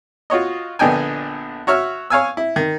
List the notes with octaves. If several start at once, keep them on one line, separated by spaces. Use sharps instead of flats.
F4 F#4 C#5 D#5
A#1 D3 B3 D#5 G5 G#5
F#4 C#5 E5 F6
C#5 F5 G#5 E6
E4
D#3